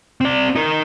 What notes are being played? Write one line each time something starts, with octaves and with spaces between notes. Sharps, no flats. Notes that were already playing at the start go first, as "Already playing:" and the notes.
C4 D5
D#4 A#4